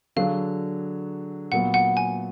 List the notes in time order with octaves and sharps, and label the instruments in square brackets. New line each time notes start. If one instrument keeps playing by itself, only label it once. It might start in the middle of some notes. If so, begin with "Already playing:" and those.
[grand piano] D3 F#3 D4 G#4 [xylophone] F5
[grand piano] A#2 F#3 B3 [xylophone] F#5
[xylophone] F#5
G#5